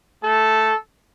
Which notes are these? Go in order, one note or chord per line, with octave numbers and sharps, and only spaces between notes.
A3 A4